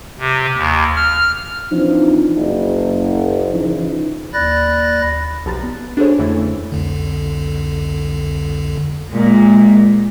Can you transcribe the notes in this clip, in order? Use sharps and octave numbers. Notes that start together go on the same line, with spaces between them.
C3
D#2
F6
E3 F3 C4 D4 D#4
F#1
C#3 E3 F3 C#4 D#4 E4
D#2 D5 B5 F#6 A6 A#6
B1 F3 G4 A#5 B5 A6
B3
D4 F#4 G#4 A4 C5 C#5
F2 D3 E3 A3 C#4 E4
C2 F2 D3
A#2 G#3